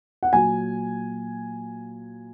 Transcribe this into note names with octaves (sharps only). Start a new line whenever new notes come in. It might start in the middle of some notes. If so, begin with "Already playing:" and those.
F#5
A#2 F#3 G#5